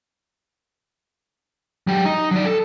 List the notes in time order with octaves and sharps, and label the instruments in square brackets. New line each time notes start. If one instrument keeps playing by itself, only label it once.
[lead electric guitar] F#3 G4
D#4
F#3 D5
A4